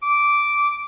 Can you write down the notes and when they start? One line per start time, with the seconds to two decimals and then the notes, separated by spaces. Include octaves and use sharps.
0.02 D6